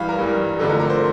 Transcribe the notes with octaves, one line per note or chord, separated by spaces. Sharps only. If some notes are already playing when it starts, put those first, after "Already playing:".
Already playing: G2 E3 G3 F5
A#4
G2 E3 G3
F2 D3 A3 A4
A#4
A#4
C5